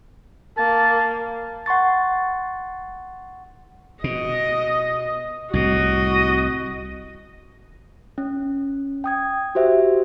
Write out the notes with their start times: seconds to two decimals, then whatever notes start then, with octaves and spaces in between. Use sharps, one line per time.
0.58 A#3 A5
1.66 F#5 C6 C#6 A6
4.04 B2 D#5
5.53 C2 A2 F#4 D#5
8.18 C#4
9.04 G5 D#6 G#6
9.55 F#4 G4 C5 E5